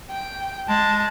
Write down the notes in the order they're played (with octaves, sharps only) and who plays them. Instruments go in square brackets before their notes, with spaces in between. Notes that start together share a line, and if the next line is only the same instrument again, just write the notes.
[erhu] G5
[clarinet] G#3 [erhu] A5